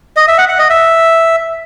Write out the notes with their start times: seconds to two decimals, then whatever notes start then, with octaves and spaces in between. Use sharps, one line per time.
0.16 D#5
0.28 E5
0.38 F#5
0.49 F#5
0.59 D#5
0.70 E5